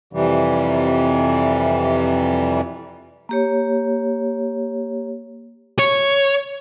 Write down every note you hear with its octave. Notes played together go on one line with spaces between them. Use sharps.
F2 C3 E3 G3
A#3 G4 C#5
C#5